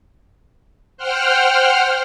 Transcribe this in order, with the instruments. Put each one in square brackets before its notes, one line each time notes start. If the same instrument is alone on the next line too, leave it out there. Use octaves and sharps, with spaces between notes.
[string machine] C5 F#5 G5 F6